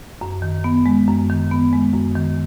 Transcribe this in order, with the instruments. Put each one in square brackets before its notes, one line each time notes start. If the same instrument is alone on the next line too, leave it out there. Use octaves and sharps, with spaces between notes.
[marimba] F#2
D#3
B3
G#3
F#2
D#3
B3
G#3
F#2
D#3